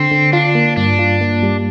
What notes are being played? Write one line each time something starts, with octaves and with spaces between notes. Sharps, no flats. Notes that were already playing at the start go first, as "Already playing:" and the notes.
Already playing: D3 C4
D3
D4 F4
A#3
G2 D4
F4
A#3
G3